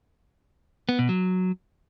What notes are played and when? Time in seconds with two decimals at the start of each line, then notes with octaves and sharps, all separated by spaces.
0.89 B3
0.99 B2
1.09 F#3